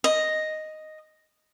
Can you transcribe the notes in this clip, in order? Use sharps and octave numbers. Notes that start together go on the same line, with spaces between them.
D#5